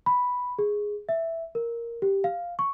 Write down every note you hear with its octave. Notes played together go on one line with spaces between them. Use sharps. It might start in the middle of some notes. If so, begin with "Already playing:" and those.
B5
G#4
E5
A#4
G4
F5
C#6